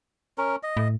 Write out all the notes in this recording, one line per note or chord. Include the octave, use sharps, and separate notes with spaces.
C#4 A#4
D#5
A2